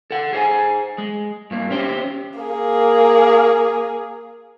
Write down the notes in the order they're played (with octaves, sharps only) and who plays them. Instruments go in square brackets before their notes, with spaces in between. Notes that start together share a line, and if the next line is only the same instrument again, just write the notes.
[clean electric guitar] A4 F#5
G#4 C5 G#5
G#3
G2 A#3
C#4 G4 C5
[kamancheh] A#3 G#4